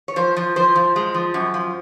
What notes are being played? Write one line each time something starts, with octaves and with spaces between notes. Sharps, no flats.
C#5
F3 C5
F3
F3 C5
F3
G#3
F3
F#2
F3